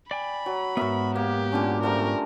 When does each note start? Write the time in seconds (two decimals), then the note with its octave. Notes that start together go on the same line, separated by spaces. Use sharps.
0.11 D5 G5 G#5 B5
0.46 F#3
0.77 G#2 B3 F#4 A#4 E5
1.15 A#3 G4
1.52 A#2 D3 C#4
1.83 F3 G3 A3 A#4